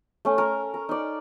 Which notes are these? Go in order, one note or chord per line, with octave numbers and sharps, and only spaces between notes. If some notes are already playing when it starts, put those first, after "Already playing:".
A3 C#4
A#4
A#4
D#4 D5